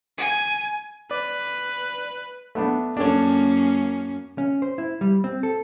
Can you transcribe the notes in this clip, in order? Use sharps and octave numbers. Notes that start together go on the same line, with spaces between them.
G#5
B4 D5
A3 B3 D4
F#2 A#3 C#4 D4 A4 C#5
C#4
C5
E4
G3
C4
A4